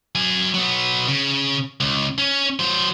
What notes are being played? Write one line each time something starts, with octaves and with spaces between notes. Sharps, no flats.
F#3 G#5
F#3 B3
C#3
C#2
C#4
F#3 C5